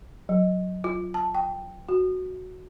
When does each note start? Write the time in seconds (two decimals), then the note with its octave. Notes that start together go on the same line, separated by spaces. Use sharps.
0.29 F#3
0.84 F4
1.14 A5
1.34 G5
1.89 F#4